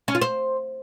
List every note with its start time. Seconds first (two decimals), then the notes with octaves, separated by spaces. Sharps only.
0.08 C#4
0.15 F4
0.21 C5